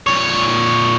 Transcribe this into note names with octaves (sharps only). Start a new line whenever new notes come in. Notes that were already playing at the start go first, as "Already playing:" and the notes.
A#2 C#5